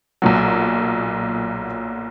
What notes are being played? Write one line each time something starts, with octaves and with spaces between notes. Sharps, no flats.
B1 A#2 F#3